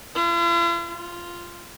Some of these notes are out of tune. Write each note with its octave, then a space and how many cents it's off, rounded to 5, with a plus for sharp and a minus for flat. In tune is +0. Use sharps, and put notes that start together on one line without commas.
F4 -45
F4 -5